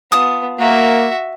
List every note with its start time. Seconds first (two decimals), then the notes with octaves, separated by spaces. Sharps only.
0.12 B3 F4 A5 D#6
0.59 A#3 F#4 E5